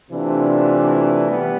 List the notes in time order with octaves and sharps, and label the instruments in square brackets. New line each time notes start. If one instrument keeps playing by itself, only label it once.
[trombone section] C3 E3 A3 D4 F4
G3 B3